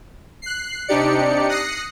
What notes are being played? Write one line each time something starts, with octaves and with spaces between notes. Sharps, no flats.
F#6 C7
C3 D4 D#4 G4 D5 C#7
D#6 F#6 A#6 C7 C#7